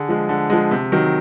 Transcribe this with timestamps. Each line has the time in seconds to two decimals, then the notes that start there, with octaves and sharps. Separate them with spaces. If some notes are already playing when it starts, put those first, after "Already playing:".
Already playing: D3 G#4
0.09 F3 G#3
0.29 D3
0.50 F3 G#3
0.71 C3
0.92 D#3 F#3